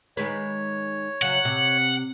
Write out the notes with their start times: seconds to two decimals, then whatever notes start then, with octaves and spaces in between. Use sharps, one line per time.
0.17 D#3 G#3 B4 C#5
1.22 C#3 F#3 F#5
1.45 C3